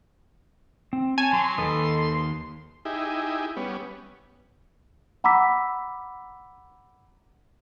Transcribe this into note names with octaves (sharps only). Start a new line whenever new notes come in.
C4
C#5 G#5 A5
F#3 C6
D#2 A4 B4 D#5
D#4 E4 G4 G#4
G3 B3 C#4
F#5 A#5 B5 D6 E6 B6